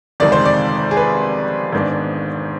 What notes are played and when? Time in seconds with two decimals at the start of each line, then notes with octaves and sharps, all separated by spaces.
0.20 G1 F2 C3 D#3 G#3 D5
0.32 C5
0.45 D5
0.91 G#4
0.97 B4
1.72 G#1 G#2 D#3 B3 D4